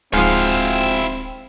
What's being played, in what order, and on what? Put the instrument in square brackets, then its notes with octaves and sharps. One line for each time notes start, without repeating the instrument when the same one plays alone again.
[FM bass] D1 [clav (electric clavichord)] G#2 F3 [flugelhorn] C4 [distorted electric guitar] E4 F5